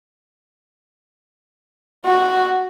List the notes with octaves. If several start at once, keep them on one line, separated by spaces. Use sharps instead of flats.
F#4